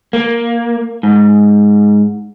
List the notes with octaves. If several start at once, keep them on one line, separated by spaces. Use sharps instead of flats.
A#3
G#2